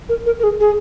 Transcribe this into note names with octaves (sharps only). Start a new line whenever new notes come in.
A#4
A#4
A#4
G#4
G#4